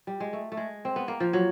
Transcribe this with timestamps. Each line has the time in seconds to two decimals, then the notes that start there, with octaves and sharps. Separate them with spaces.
0.07 G3
0.20 G#3
0.33 A3
0.52 A3
0.57 G#3
0.85 C4
0.96 B3
1.08 A#3
1.20 F3
1.33 F#3